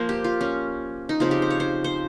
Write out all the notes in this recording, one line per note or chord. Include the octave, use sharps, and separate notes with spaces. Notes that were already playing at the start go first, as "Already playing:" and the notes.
Already playing: F3 A#3 A#4 C5
G4
F4
C#4
D#4
C#3 F3 C4 F4
G4
C5
C#5
C5
C5